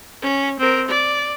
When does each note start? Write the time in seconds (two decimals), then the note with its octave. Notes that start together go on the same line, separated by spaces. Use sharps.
0.23 C#4
0.59 C4 A#4
0.88 D5